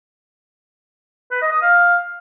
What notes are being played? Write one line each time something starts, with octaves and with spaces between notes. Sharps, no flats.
B4
D#5
D#6
F5